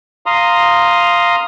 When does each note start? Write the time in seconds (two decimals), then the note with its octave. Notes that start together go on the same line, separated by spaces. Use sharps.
0.26 F5 A#5 C6 D#6